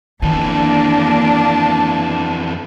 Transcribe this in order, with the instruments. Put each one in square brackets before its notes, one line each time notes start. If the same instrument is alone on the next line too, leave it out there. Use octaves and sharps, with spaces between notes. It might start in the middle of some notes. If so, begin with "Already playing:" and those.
[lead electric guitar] F2 E3 [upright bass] D#3 [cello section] A#3 D4 [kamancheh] A5